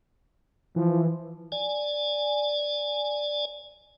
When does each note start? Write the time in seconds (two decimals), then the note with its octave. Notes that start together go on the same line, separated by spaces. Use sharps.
0.76 E3 F3
1.52 D5 G#5